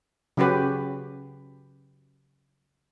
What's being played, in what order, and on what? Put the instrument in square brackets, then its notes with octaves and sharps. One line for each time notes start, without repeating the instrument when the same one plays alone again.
[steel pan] C#3 F#3 C#4 F#4 G4 B4